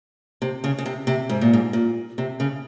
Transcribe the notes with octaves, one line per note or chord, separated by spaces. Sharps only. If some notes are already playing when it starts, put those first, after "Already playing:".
C3
C#3
C#3
C3
C3
G#2
A#2
G#2
A#2
C3
C#3